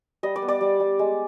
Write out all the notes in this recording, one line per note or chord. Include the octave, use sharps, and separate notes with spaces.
G3 D#5
D5
B3
D5
G3
G3
G#3